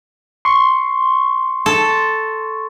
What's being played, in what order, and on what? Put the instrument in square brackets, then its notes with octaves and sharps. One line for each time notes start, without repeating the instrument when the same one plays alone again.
[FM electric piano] C6 C#6
[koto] A4